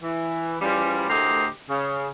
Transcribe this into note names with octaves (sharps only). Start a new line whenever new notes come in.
E3
C#3 E3 F3 G3
D2 A2 G4 A#4 C5 D#5
C#3